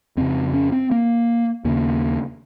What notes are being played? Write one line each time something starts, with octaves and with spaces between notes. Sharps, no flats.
F2 C#3 C4
C#4
C4
A#3
D#2 C#3 A#3